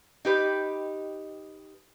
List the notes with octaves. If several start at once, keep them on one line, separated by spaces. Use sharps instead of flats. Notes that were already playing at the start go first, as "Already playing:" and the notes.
D#4 G4 B4